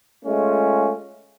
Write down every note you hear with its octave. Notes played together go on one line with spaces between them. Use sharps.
G#3 A3 C#4 F4